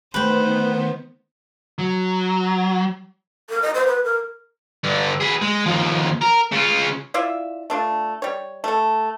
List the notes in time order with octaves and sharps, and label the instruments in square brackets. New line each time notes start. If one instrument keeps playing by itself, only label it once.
[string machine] D#3 B3 [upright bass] A3 [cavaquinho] B4 G5 [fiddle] C5
[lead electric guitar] F#3
[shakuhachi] A#4
D#5
C5
B4
A#4
[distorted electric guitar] G2 D3
G#4 B4
G#3
D#2 F3
A#4
C#3 F4
[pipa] E4 F4 D5 E5
A3 D4 F4
G3 C#5
A3 A4